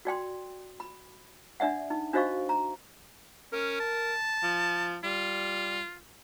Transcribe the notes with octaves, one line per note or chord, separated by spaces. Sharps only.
F#4 D5 G5 C6
B5
D4 D5 E5 F#5
D#4
D4 F#4 C5 D#5 F5 C#6
A#5
C#4 A#4
A5
F3
G3 F4